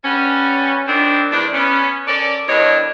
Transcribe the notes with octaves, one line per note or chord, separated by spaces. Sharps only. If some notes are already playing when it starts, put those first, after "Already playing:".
G3 B3 C#4
D#3 F3 B3 C4 D4
E2 A2 C3 D4
B3 C#4
C#4 A4 A#4 D5
E2 G2 D#3 D4 C#5 D#5